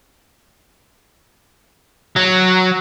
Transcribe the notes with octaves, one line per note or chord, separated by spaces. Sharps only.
F#3